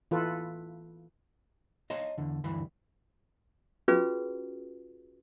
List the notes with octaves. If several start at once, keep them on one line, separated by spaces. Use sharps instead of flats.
E3 F4 A4 B4
C#5 D#5 F5 A5 A#5 C6
E2 D3
D2 G2 E3 B5
C#4 F4 F#4 G#4 B4